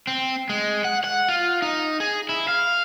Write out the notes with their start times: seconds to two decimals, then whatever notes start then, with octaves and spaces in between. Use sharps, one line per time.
0.07 C4
0.49 G#3
0.84 F#5
1.04 F#5
1.29 F4
1.62 D#4
2.00 G#4
2.29 E4
2.48 F5